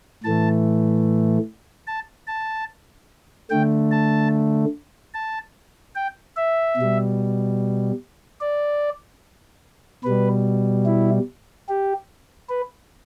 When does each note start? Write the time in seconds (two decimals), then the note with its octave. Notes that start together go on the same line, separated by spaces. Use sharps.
0.24 A2 E3 A3 A5
1.87 A5
2.27 A5
3.50 D3 A3 G5
3.91 A5
5.14 A5
5.95 G5
6.37 E5
6.77 B2 G3
8.41 D5
10.04 B2 G3 B4
10.86 E4
11.69 G4
12.49 B4